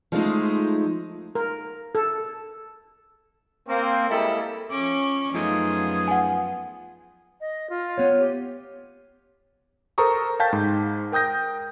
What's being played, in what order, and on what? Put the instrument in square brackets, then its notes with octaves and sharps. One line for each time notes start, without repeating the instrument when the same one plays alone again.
[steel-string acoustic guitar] F3 G#3 A3 D#4
[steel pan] A#4
A4
[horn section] A#3 C4
G3 G#3 A#3 E4 G#4 A4
[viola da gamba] F3 C#4 [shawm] D6
[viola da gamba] F#2 B3 F4 [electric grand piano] F3 A3 D#4 [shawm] G#4
[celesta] F#5 G#5
[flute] D#5
F4
[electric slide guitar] B3 C#5
[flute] G4
[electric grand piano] A4 A#4 C5 A#5 C#6 D#6
F5 G5 A5 G6 A6 B6
G#2
A#4 G5 D#6 G6 A#6